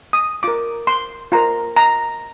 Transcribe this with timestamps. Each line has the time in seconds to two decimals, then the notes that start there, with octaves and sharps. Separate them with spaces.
0.13 D#6
0.43 F4 A#4 D6
0.87 C6
1.32 F4 A#4 A#5
1.76 A#5